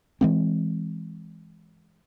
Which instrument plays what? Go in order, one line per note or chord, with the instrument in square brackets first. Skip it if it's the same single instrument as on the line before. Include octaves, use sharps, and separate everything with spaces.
[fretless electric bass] E3 G#3 C4